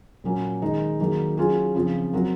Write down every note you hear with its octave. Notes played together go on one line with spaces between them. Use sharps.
A#2 F#3 A#3 C#4
D#3 G#3 D#4
D#3 F#3 A#3 D#4 G#4
F#3 C#4 F4 G#4
C#3 F3 C4
F#3 C4 F#4 A#4